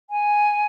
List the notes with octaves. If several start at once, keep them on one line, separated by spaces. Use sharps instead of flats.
G#5